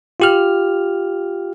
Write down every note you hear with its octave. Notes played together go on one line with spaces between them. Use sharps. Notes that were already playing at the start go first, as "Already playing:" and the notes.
F4 G4 F6